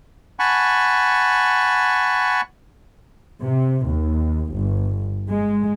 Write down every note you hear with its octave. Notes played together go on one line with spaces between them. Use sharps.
F#5 G#5 A5 B5 C#6
C3
D#2
G1
G#3